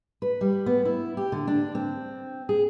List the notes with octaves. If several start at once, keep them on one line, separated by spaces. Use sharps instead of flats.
B4
G3
B3
E4
G4
D3
D4
C4
G#4